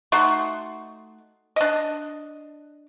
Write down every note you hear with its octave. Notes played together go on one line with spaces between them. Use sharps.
A3 D#4 F#4 C6
D4 D#5